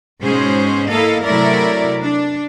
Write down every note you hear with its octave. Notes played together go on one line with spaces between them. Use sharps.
G#2 B2 G#3 C#4 G#4 C5
A#3 E4 A4 D#5 F5
C3 F#3 A3 E4 A#4 D5
D4